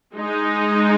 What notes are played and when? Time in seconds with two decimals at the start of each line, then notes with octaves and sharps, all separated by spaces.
0.15 G#3 D#4